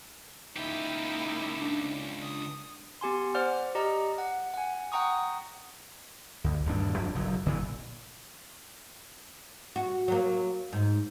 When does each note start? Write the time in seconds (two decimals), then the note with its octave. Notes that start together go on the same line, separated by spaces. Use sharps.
0.56 C#2 A#3 D#4 E4 G4
1.62 D4
2.18 D#6
3.01 B3 G4 G#5 C6
3.35 C5 D5 F#5 F6
3.75 G4 D5 D#5 A#5
4.18 F#5
4.54 F#5 G#5
4.92 F#5 G5 A#5 C#6 D#6
6.44 D2
6.66 D#1 D2 G2 D4
6.98 F2 D4
7.15 F#1 B1 F#3
7.46 F#1 A#2 D3 E3
9.76 F#4
10.08 F#3 A#3
10.73 G#2